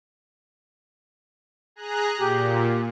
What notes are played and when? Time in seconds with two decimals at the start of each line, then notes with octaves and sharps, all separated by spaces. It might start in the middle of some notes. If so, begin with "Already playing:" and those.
1.76 G#4 A#5 F#6
2.18 A#2 G4